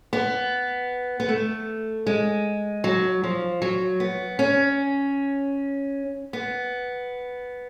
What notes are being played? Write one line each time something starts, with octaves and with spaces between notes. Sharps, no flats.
B3
B3
A3
G#3
F#3
F3
F#3
B3
C#4
B3